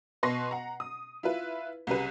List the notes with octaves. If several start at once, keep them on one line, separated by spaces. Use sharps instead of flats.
B2 B4 C6 C#6 A#6 C7
F#5 A#5
D#6
E4 F4 B4
C2 C#3 G4 B4